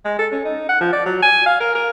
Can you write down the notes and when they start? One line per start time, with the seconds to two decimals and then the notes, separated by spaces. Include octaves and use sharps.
0.05 G#3
0.19 A4
0.32 C#4
0.45 D#4
0.69 F#5
0.81 F3
0.93 D5
1.06 F#3
1.22 G#5
1.46 F5
1.60 A#4
1.75 A#4